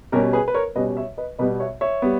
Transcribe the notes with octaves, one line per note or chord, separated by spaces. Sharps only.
B2 G3 C#4 G4 A#4
G#4 B4
B4
A#4 C#5
B2 G3 C#4 B4 D#5
C#5 E5
B4 D#5
B2 G3 B3 B4 D#5
C#5 E5
C#5 E5
G3 B3